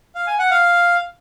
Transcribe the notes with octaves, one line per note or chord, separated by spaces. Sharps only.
F5
G#5
F#5
F5